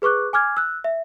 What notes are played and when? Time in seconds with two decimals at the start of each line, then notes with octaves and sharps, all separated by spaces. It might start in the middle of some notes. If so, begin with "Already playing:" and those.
0.02 G#4 B4 C#6 D6 F#6
0.33 G#5 D6 F6 G#6
0.57 E6 F#6
0.84 E5